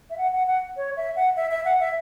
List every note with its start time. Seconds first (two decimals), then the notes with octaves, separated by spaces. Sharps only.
0.10 E5
0.18 F#5
0.33 F#5
0.47 F#5
0.77 C#5
0.97 E5
1.16 F#5
1.36 E5
1.51 E5
1.65 F#5
1.80 E5